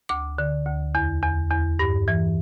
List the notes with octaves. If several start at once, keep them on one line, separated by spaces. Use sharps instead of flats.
D2 D6
D3
D2
E2
E2
E2
G2
E3